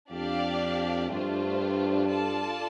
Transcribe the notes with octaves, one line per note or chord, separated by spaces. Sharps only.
F2 D4 G4 D5 F5
G2 A3 D4 F4 C5
F4 A4 D5 A5